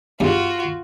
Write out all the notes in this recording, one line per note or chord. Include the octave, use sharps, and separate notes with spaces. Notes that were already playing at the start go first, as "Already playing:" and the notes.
E2 G2 F4 F#4